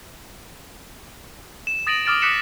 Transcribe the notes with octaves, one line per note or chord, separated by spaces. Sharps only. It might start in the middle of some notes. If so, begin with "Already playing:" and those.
E7
D#6 A6 A#6 D7 D#7 F#7
D6 D#6 F6 A6 D7 E7
D6 D#6 F#6 B6 C#7 E7